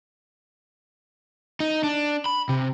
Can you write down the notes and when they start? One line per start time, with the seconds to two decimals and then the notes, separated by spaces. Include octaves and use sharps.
1.60 D#4
1.83 D4
2.26 B5
2.49 C3